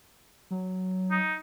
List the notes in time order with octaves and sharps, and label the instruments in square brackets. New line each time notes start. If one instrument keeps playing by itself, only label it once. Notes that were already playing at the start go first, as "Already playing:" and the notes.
[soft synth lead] F#3
[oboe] D#4